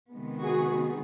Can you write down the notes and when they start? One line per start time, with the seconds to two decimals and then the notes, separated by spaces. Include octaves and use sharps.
0.11 C3 D#3 G#3 B3
0.43 F#4 G#4